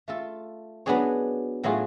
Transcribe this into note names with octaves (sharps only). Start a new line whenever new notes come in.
A3 F4 A4
F#3 B3 D4 G#4 C#5
A2 F#3 A3 F4 G#4